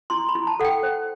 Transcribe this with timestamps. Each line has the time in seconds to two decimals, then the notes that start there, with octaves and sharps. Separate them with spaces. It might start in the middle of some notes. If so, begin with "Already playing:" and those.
0.10 E4 C6
0.29 B5
0.35 E4
0.47 A5
0.60 A4 F#5
0.65 G5
0.83 C5